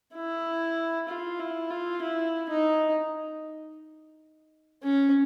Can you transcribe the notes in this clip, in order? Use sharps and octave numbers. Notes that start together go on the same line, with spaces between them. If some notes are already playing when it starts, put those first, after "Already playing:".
E4
F4
E4
F4
E4
D#4
C#4